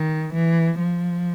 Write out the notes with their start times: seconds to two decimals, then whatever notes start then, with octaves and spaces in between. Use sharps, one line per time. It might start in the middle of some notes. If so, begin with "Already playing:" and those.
Already playing: D#3
0.34 E3
0.80 F3